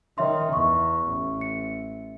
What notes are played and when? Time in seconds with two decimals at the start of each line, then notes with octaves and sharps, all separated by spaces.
0.18 D#3 C#5 E5 C6
0.53 E2 C#6
1.09 A1 A3
1.41 C#7